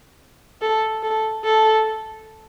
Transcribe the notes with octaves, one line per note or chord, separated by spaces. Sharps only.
A4
A4
A4